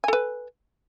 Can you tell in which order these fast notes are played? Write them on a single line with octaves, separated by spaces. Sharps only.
G#5 A4 B4